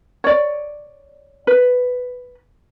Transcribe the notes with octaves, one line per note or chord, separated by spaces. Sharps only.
C#5 D5
B4